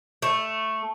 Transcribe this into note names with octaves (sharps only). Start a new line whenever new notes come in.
A3